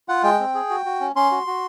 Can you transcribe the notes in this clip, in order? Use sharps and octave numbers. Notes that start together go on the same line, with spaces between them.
F4 F#5
G#3 G5
C4
G#4
F#4
F#4
C#4
C#4 C6
F#4
F#4